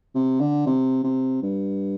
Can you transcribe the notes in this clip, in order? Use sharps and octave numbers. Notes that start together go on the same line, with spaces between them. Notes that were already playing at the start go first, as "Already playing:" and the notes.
C3
D3
C3
C3
G2